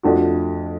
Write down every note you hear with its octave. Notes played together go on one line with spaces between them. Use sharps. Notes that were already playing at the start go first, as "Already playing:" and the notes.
F2 F3 A3 D4 F#4